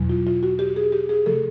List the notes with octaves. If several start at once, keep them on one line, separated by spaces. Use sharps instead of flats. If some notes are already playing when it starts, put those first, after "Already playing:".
Already playing: E2 B2 F#3
F4
F4
F#4
G4
G#4
G4
G#4
C3 F3 A3 A4